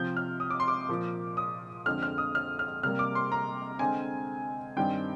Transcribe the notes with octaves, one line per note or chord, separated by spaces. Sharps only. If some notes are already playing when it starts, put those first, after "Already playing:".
Already playing: C3 F3 C4 G6
F6
D#6
D6
C6
D6
A#2 F3 A#3
D#6
F2 D3 G#3 C4 F6
F6
D#6
F6
F6
C3 G3 A#3 F6
D6
C6
A#5
D3 G#3 C4 G#5
G2 D#3 G3 C4 G5